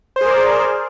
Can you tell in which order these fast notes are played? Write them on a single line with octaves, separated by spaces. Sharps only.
C5 G#4 A#4 D5